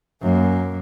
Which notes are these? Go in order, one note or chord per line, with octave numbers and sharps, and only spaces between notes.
F#2 A#3